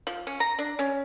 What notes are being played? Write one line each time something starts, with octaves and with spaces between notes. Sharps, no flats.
F3
C#4
A#5
D4
C#4